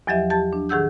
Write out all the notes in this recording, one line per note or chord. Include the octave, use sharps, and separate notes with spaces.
E2 F3 F#3 G4 D#5 E5
G4 A5 A6
D4
A2 D#3 G#4 F#5 E6 G6